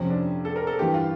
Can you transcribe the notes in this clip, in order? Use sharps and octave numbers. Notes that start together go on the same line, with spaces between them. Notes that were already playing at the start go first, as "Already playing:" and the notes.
Already playing: F2 C3 F3 C#4
D4
A4
A#4
A4
G2 E3 G4
F4